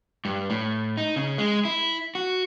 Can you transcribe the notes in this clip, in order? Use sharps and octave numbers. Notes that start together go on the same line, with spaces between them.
G2
A2
D#4
C#3
G#3
E4
F#4